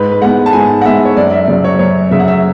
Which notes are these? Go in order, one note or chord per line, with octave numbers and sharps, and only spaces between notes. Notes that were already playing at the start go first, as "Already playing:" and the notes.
Already playing: G#2 B4
B4
G#3 B3 F#5
A5
G#2 G#5
F#5
G#3 B3 E5
C#5
F#2 D5
E5
C#3 F#3 D5
C#5
F#2 C#5
C#3 F#3 E5
F#5
E5